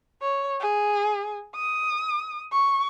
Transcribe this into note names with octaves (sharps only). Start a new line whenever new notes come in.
C#5
G#4
D#6
C#6